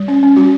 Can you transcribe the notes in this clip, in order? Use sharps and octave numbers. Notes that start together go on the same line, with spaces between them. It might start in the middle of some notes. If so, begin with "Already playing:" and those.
Already playing: G3
C#4
C#4
G3 F#4